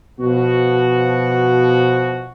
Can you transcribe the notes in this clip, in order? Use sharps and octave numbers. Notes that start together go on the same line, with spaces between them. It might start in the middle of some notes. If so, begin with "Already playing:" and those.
B2 F3 F#4